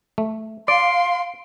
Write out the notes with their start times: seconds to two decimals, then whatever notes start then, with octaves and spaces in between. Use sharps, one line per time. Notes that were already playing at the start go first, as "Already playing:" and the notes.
0.18 A3
0.68 D5 F5 C6 D7